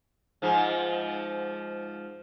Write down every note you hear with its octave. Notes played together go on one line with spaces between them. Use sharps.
G#2 F3